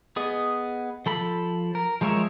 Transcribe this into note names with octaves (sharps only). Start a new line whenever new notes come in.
B3 G#4 D#5
F3 A4 B5
A#4
F3 G#3 A#4 C#5 E5